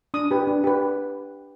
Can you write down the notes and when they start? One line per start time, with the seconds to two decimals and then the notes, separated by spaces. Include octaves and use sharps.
0.14 D4 D#6
0.31 G4 B4
0.47 D4
0.64 G4 B4